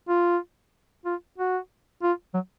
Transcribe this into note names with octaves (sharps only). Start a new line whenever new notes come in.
F4
F4
F#4
F4
F#3